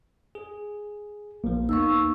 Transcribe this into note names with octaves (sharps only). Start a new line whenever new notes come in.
G#4
A#1 F3 A#3
D#2 A#3 B3 D#4 C#6 E6